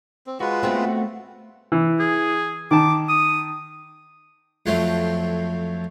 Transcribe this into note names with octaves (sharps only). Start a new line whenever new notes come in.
C4
G#3 F4 F#4 B4
A3 B3 C4
E3
G#4
D#3 A5 D6
D#6
F2 F3 F#3 A3 C4